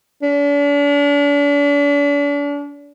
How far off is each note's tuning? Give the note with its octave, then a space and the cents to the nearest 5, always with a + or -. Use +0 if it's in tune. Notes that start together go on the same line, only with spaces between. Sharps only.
D4 -40